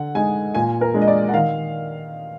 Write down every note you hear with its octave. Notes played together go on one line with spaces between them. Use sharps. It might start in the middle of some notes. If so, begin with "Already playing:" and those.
Already playing: D3 F#5
G#3 D#4 G#5
A#2 G#5
A#4
G#3 D4
D#5
D5
F#5
D#3 F5